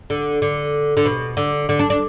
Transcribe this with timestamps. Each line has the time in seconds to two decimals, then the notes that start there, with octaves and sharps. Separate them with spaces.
0.10 D3
0.42 D3
0.97 D3
1.05 B2
1.37 D3
1.69 D3
1.79 D4
1.90 D4